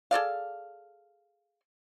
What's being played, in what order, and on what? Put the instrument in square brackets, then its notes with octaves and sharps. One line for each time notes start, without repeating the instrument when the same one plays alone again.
[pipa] G#4 A4 D5 F5